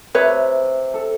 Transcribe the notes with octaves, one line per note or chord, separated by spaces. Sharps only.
C3 B4 C#5
A4